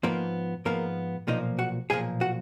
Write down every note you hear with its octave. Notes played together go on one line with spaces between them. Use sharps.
G#2 F3 A#3 B3 A#4
G#2 F3 A#3 B3 A#4
B1 A#2 F3 A#3 D#4 D#5
F#4 F#5
B1 A#2 F3 A#3 G#4 G#5
F#4 F#5